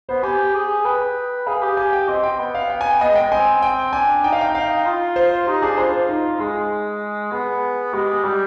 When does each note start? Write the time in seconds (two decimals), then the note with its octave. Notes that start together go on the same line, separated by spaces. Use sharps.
0.09 B3 C5
0.23 G4 G#5
0.54 G#4
0.85 B4 G5
1.47 G#4 F5
1.62 G4
1.77 G#5
1.93 G5
2.08 C4 D#5
2.24 G5
2.39 B3
2.55 F5
2.70 G5
2.81 G#5
2.91 G5
3.00 B3 D#5
3.10 G#3
3.16 G5
3.22 G#3
3.32 C4 G#5
3.62 G5
3.93 D4 G#5
4.24 D#4 G5
4.33 F5
4.41 G5
4.55 F5
4.86 F4
5.16 C5
5.47 D#4 G4
5.62 D4 G#4
5.77 F4 C5
5.93 C5
6.09 D#4
6.40 G#3 G#4
7.32 B3 G#4
7.93 G#3 G4
8.24 G3 G4